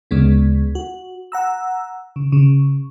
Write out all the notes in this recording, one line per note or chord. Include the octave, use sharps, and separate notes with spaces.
D2 C#3 G#3 B3
F#4
F#5 A#5 E6
C#3
C#3